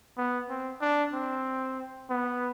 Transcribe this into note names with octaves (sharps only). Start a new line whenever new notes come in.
B3
C4
D4
C4
B3